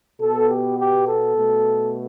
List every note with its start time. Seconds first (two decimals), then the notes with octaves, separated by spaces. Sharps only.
0.21 B2 B3 A4
0.50 G4
0.79 G4
1.08 A4
1.37 B2 A3